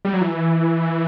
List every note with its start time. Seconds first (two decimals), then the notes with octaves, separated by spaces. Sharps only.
0.05 G3
0.13 F#3
0.21 E3